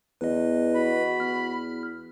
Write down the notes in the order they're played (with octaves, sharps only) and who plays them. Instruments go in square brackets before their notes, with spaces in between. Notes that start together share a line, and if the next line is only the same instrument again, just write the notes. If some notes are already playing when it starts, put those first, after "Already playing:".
[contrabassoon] E2 [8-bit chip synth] B4 D#5
[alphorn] F#4 [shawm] B5
[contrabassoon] E2 [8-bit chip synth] F6